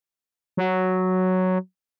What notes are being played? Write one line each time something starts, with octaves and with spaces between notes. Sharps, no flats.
F#3